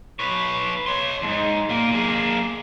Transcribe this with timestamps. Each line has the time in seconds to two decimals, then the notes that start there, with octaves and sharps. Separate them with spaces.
0.19 B4 C#5
0.86 C#5 C6
1.22 D#2 G#2
1.69 A#2 A#3
1.91 A#3 G#4